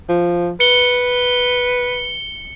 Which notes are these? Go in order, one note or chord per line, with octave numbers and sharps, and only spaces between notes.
F3
B4 C#7 G7